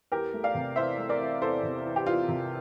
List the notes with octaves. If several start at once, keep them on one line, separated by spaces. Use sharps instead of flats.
E2 G4 A#4
A3
D5 F5
C3
E3 C5 E5
A3
A#4 D5
E3
E2 A4 C5
C3
E3
G4
E3 F4
C3